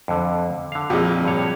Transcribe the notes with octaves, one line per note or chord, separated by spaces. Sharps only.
F2 D3
D3 F5
F2 A#2 F#4 G#4
G2 C#5